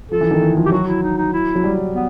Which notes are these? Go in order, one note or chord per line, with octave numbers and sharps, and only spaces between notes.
F3 A4
E3
D#3
E3
F3
G4
F#3 F#4
E4
D#4
D#4
E4
F#3
G3
B3